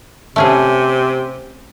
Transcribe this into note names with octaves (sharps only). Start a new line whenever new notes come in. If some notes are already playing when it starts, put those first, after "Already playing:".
C3 A3 C#4 G#4